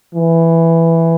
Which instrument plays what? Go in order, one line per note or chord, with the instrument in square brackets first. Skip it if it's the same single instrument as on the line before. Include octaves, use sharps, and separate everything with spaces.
[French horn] E3